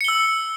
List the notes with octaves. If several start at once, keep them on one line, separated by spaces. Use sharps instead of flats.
E6 C#7 G7